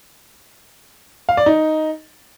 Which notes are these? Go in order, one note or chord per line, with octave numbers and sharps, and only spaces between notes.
F5
D5
D#4